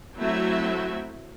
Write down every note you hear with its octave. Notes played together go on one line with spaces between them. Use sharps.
F#3 A3 C4 E4 F#4 E5